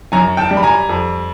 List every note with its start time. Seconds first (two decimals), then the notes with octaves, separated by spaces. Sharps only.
0.12 F#2 G#5 A#5
0.37 G5 A5
0.51 G3
0.57 B5
0.63 G#5 A#5
0.89 F2